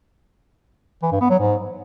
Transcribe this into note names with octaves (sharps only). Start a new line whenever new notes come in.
E3
G2
B3
F#3
G#2